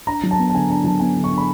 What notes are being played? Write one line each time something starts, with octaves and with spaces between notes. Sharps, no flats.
D4 A#5
F#3
A5
B3
A5
D3 G#5
D4 A5
F#3 A5
B3 G#5
D3
C#6
D4
B5